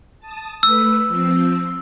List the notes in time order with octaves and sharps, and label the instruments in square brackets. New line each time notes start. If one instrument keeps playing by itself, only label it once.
[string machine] A5 D#6
[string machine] A3 B4 [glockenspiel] E6
[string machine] F3 C4